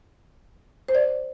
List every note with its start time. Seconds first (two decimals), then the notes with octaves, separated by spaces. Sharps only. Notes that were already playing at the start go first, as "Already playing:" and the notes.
0.88 C5
0.95 D5